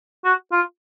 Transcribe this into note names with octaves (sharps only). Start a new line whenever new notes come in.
F#4
F4